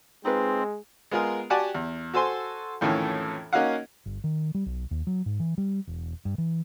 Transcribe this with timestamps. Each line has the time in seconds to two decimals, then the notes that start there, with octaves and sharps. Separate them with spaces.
0.25 G#3 C4 D#4 F4 B4
1.11 G#3 B3 F4 G#4 A#4
1.50 F#4 G4 D5 F#5 G#5 A5
1.75 E2
2.14 F#4 A4 C5 G#5 C6
2.81 F2 A2 D#3 E3 C#4 A4
3.53 A#3 C#4 D#4 F#4 F5 F#5
4.06 G1
4.24 D#3
4.55 G3
4.66 B1
4.91 D#2
5.07 F#3
5.26 G#2
5.40 E3
5.58 G3
5.87 E1
6.25 G2
6.38 E3